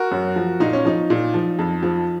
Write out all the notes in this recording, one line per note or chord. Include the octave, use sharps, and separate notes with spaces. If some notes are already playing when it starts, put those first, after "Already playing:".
Already playing: F#4 A#4
F#2
F3
A#2 D#4
C#4
F3 D#4
A#2
F3
F2
F3